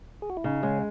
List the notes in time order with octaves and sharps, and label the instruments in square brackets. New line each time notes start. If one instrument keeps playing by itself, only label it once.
[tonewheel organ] G#4
F#4
E4
[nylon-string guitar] C#3 [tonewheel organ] D#4
[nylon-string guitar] G#3 [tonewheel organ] C#4